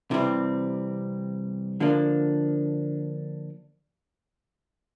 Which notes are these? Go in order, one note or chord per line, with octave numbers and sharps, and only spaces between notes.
C3 E3 G3 C4
D3 F3 A#3 D4